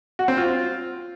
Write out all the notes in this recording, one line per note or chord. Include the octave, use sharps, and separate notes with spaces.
F#4
C4
F4